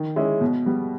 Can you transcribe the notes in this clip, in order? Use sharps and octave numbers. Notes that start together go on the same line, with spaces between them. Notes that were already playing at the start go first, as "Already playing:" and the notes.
Already playing: D#3
G#3 C#4 E4
B2
G3 B3